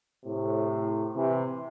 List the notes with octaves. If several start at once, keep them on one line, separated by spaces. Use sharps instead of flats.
A2 C3
C3 E3